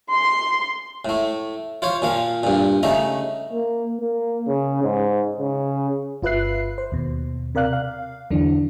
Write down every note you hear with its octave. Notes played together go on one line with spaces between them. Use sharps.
C6
A2 A3
F4 C5 C#5 F5
A#2 F3 F5
G2 A#2
C#3 A3 D#4 A#5
A#3
A#3
C#3
G#2
C#3
G1 F4 B4 E5 F#6 C7
C5
D#2 B2
C3 A#4 D5 F5 F#6
F5
E2 D3 E3 F#3 D4